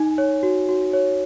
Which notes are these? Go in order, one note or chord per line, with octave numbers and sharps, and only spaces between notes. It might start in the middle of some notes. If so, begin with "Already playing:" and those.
Already playing: D#4 G#5
C#5
F#4
F#4
C#5